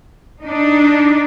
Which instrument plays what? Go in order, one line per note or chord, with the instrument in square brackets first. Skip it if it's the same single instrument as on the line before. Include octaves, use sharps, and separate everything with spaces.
[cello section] D4 D#4